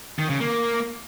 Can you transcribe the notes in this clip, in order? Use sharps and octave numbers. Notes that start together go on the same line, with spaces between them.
D#3
C#3
A#3